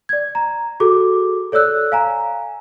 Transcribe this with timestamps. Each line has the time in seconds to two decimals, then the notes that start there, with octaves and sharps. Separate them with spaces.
0.09 D5 G#6
0.35 A#5
0.80 F#4 G#4 A4 D6
1.52 A4 C#5 D5 E6 F#6
1.92 F5 G#5 A#5